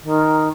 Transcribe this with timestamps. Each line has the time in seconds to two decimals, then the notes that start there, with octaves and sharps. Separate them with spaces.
0.03 D#3